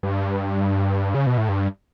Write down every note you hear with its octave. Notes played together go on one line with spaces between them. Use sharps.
G2
C#3
B2
A2
G2